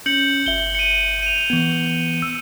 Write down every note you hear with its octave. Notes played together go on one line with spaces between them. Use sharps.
C#4 G6 C#7 F#7
G1 E5 G7
C#7 D#7
D#7 F7
E3 B3
E6